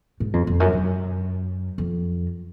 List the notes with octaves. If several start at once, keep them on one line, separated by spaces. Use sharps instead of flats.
G#2
F2
F2
F#2
F#2
F2